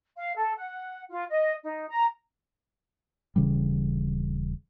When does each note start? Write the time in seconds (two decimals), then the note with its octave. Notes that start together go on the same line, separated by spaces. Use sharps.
0.16 F5
0.35 A4
0.56 F#5
1.10 F4
1.30 D#5
1.63 D#4
1.89 A#5
3.36 D#1 C#3 E3 G3